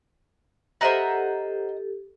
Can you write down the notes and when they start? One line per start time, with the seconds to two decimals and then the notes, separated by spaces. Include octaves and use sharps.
0.81 G4 A4 A#4 C5 D#5 E5 F#5